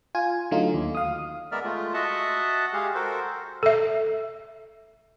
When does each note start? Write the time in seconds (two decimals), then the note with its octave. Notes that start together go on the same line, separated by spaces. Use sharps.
0.15 F4 G#5
0.51 D3 F#3 A3 D#4 F4
0.74 D#2
0.95 F5 D#6
1.52 G#3 B3 A#4 D5 E5 F6
1.64 G#3 A3 F4
1.94 F#4 D#5 E5 F#5 A5
2.73 G#3 G4 G#4 F5
2.95 F#4 A4 A#4 C5
3.63 A4 E5